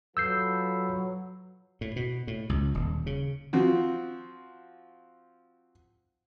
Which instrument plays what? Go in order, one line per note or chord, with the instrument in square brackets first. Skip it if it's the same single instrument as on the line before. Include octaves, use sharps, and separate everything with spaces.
[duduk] F#3 [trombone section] F4 A4 B4 [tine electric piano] E6 G6 C7
[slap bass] A2
B2
A2
C#2
D#1
C#3
[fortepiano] F3 C4 F#4